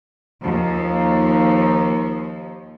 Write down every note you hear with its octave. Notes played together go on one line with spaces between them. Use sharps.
D#2 F3